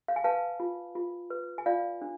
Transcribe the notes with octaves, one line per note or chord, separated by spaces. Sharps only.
F5
G#5
B4 F5 A5
F4
F4
B4
G#5
F4 D5 F5
D4